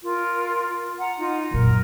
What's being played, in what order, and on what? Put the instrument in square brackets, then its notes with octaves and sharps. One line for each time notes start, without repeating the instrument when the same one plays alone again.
[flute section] F4 A#4
F#5 A#5
D#4 F4
[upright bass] F#2 A#2 [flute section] A#4